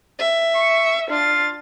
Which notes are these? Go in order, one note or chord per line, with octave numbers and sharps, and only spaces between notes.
E5
C#6
D4 F4 A6